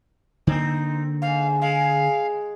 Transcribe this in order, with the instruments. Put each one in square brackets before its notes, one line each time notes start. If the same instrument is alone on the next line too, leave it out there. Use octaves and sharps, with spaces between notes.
[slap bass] D3 A#3 [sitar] C4 [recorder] D#4
[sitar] G#2 [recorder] F5
[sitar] G#3 [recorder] F5